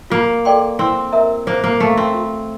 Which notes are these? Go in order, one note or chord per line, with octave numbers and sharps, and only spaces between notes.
A#3 F4
A4 D5 G5 C6
C4 E4
A#4 E5 A#5
A#3 C5
A#3
A3 F5 A#5
C4
F4